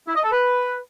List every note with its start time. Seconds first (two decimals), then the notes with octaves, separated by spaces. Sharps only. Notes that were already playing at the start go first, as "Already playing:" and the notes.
0.08 E4
0.16 D#5
0.24 A4
0.32 B4